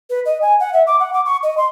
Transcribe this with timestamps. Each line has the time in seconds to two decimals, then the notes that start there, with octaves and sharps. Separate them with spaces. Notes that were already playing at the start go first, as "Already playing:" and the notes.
0.10 B4
0.25 D#5
0.42 G#5
0.60 F#5
0.73 E5
0.87 D6
1.00 F#5
1.13 D6
1.25 C#6
1.43 D#5
1.58 C6